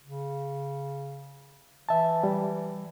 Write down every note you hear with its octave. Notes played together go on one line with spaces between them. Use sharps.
C#3
E3 E5 A5
G3